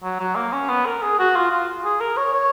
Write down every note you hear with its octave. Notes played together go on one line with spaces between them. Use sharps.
F#3
F#3
A#3
C#4
B3
A#4
G#4
F#4
F4
F4
G#4
A#4
C#5
C#5